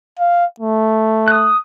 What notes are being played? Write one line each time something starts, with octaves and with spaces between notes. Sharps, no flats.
F5
A3
D#6 F#6